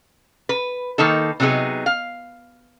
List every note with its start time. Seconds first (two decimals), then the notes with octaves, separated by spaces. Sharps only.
0.49 B4
0.98 D#3 A#3 D#4 A4
1.40 C3 F#3 B3 D#4 G#4
1.86 F5